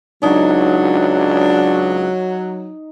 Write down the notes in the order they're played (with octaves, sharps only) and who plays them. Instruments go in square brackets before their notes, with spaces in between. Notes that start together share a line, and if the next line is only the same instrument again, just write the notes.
[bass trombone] C#2 [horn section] F#3 [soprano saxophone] D4 [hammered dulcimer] D#4